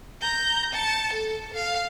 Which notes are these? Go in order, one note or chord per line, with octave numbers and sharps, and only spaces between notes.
A#5 G6
A5 C#7
A4
F5